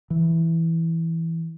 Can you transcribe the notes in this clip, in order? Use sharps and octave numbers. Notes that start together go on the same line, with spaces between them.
E3